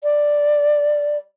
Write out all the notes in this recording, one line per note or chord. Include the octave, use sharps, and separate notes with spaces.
D5